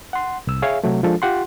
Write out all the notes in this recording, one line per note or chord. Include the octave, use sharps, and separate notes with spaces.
F#5 C6
C2 E6
G#4 C#5 E5 F5
C3 F#3 A3
F3 G#3 D4 F4 A4
F4 G4 F#5 C6